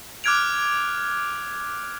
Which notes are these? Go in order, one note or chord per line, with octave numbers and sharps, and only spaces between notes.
D6 F6 F#6 G#6 D7 F7